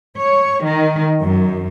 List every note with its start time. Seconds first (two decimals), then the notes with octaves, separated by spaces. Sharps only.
0.16 C#5
0.64 D#3
1.19 F#2